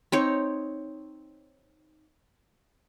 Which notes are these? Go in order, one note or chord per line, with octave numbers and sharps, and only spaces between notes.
C4 D#4 C#5